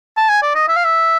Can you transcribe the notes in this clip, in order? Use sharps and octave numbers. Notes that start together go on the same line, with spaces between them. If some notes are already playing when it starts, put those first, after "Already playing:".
A5
G#5
D5
D#5
E5
F5
E5